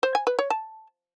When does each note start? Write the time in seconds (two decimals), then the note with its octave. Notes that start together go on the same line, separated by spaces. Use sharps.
0.03 C5
0.15 G#5
0.27 B4
0.39 C#5
0.50 A5